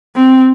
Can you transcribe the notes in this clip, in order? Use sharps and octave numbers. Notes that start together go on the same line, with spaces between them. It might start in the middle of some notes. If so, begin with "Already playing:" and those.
C4